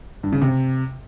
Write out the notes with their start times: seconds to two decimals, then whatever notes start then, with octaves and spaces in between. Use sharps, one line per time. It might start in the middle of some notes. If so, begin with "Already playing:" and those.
0.24 G2
0.33 C#3
0.42 C3